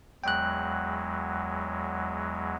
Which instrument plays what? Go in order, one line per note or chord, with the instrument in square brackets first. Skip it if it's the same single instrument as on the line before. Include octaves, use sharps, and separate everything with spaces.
[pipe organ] E2 F#3 G#3 [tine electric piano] G5 F#6